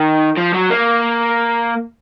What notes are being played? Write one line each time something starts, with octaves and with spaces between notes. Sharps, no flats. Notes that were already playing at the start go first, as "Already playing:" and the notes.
Already playing: D#3
F3
F#3
A#3